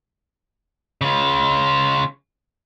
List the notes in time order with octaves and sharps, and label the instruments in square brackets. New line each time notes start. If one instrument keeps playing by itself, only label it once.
[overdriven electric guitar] C#3 F4